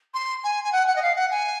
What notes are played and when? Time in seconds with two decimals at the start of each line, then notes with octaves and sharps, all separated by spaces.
0.14 C6
0.44 G#5
0.64 G#5
0.72 F#5
0.87 F#5
0.95 D#5
1.02 F5
1.16 F#5
1.31 G#5